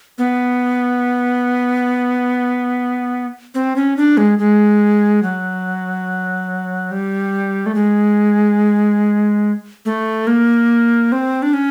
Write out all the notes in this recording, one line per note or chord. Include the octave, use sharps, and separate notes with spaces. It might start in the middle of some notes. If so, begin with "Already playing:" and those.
B3
C4
C#4
D4
G#3
G#3
F#3
G3
A3
G#3
A3
A#3
C4
D4
C#4